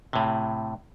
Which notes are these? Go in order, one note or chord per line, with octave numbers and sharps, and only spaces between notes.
A2 C3